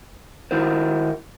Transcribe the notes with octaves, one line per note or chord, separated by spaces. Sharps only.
D#3 E4 F#4 A#4 C5